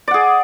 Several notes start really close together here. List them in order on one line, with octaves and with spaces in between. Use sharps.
D5 F#5 G#4